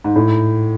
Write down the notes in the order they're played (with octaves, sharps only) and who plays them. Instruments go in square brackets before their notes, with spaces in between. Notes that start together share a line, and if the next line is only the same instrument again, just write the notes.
[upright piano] G#2
A2